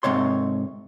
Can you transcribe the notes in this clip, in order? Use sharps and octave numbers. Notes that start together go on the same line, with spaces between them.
G#2 C3 C#5 C6